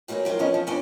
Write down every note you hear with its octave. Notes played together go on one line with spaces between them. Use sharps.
E3 F#3 A#3 D4 D#4
C3 F#3 A3 A#3 F4
A2 D#3 F3 B3 C#4 D#5
F3
F2 E3 C#4 D4 D5